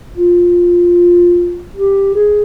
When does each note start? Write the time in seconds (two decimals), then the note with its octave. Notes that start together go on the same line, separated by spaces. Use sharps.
0.16 F4
1.75 G4
2.15 G#4